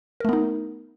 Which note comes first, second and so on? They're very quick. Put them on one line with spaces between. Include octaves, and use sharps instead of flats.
A#4 A3 B3 D#4